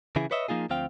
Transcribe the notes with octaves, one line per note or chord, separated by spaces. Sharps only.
C#3 E3 E4 G#4
B4 C#5 D#5 E5
F3 A#3 D#4 F4 G#4
D2 F3 C4 F5 G5